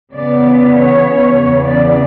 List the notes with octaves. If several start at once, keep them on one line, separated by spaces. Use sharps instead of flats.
C#3 E3 B3 D5
C#5
E2 C#3 E3 B3
D5